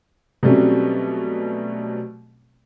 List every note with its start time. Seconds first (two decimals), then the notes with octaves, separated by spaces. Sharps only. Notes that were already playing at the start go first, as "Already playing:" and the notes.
0.43 B2 F#3 G3 A3 C4 C#4